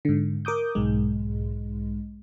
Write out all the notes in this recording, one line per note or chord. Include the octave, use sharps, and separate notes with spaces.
G#2 D3
A#4 D6 D#6 G6
B1 G#2 G#3